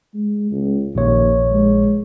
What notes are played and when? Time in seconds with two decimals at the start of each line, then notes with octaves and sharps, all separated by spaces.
0.14 G#3
0.51 C#2
0.95 A#1 D#2 C#5
1.52 G#3